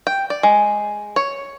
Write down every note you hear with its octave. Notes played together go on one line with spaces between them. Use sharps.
G5
D5
G#3
C#5